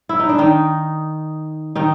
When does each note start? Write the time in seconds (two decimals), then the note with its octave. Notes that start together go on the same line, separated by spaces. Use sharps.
0.09 E4
0.19 D#4
0.29 D4
0.39 D#3 D#4
1.76 D#3 D#4